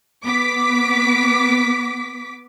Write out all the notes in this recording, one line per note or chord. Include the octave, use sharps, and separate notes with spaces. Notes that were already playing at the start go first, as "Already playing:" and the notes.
B3 D6 B6